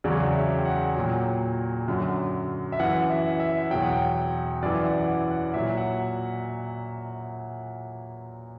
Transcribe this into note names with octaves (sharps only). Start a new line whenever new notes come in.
E2 C#3 F#3 D5
E5
G5
F#5
A#2 F#3 G5
F#2 D3 F#3
E5
F#2 E3 F#5
E5
E5
E2 B2 F#3 G5
F#5
G5
F#2 E3 D5
F#5
F#5
F#5
A#2 F#3 E5
F#5